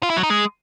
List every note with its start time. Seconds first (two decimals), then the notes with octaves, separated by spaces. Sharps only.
0.03 F4
0.10 E4
0.17 F#3
0.23 D#4
0.30 G#3